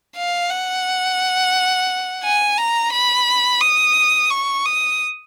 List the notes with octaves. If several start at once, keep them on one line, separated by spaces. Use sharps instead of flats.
F5
F#5
G#5
A#5
B5
D#6
C#6
D#6